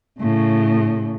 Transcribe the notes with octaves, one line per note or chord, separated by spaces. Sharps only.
A2 C#3